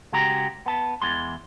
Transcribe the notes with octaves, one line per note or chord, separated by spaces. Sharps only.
C#3 G#3 F#4 G4 A#5
B3 A5
E2 E3 G#3 C6